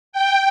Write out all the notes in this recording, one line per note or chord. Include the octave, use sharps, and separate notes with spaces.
G5